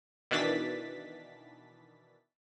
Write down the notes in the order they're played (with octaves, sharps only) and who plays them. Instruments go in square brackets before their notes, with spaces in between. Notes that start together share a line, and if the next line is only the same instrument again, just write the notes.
[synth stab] B2 D#3 E3 D4 A6 B6